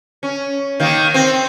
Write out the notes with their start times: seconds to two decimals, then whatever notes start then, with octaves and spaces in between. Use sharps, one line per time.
0.23 C#4
0.80 D#3 A#3
1.14 C4